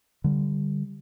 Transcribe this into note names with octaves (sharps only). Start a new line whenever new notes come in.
D3 G3